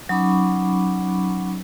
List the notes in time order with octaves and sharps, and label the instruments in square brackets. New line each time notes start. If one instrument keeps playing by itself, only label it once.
[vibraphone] F#3 C#4 D#4 B5 C#6 D6